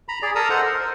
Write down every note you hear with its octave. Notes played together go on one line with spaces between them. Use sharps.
A#5 B5
G#4 D5
A4 A#4 A5 A#5 D#6 E6
A4 C5 D#5 F#5
A#4
C5